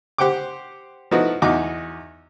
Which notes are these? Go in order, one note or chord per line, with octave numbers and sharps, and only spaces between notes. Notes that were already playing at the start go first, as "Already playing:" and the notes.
G4 C5 F#5 G5 D6
F3 A3 B3 D#4 E4 F#4
E2 D#4 F#4 D6